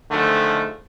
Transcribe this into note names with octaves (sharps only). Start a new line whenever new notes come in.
D3 D#3 F3 G#3 A3